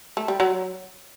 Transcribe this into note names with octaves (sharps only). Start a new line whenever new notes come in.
A3
G3
F#3